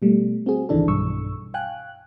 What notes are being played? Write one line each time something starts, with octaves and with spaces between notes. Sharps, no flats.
B2 G3 A3
C4 F#4 G#4
G1 C2 D#3 E3 D4 A4
B1 G2 C#6 E6
F5 G5 G#5 F#6